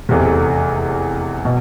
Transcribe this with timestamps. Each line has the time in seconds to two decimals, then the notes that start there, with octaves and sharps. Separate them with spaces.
0.09 F1 E2 C3
1.45 B2